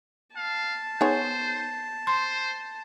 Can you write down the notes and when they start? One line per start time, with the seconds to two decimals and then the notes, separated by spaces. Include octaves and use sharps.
0.37 F5 A5
1.01 B3 D#4 G#4 C5 C#5
2.07 C5 C6